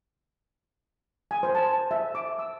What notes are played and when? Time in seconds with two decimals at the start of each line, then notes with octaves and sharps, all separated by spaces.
1.31 G#5
1.43 C5
1.55 A5
1.91 E5
2.15 D6
2.39 E6